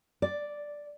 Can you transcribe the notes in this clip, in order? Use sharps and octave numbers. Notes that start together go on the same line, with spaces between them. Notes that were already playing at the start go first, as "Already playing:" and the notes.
D5